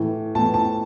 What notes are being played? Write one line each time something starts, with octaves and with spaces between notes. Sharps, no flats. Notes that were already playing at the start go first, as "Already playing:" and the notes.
Already playing: A2 E3
A2 E3 A5
A5